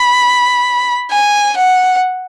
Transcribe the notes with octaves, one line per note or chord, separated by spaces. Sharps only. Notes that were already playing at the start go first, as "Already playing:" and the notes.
Already playing: B5
G#5
F#5